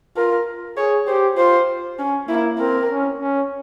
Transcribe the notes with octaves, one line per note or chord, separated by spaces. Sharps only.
F4 A#4
G#4 C#5
G4 C5
F4 C5
C#4
A#3 E4
C4 A#4
C#4
C#4